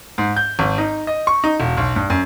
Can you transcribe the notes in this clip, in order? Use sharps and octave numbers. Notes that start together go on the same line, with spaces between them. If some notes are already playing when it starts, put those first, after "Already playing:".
G#2
G6
G#1
D#4
D#5
C#6
D#4
E1
B1
G2
F#2